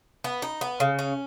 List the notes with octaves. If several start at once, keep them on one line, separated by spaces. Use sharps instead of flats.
B3
D#4
B3
C#3
C#4